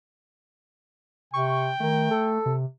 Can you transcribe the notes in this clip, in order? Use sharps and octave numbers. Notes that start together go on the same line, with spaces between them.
C3 G5 C#6
D#3 A3
A4
C3